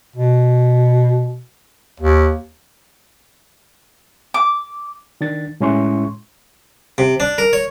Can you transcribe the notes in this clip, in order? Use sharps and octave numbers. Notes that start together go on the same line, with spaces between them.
B2
D#2
D6
D#3 D4 A6
A2 G#3 C#4 E4 C6 C#6
C3
D4
A#4
C#5